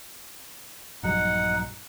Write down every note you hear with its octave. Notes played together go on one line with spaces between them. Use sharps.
A#1 G2 F#3 D#4 F#5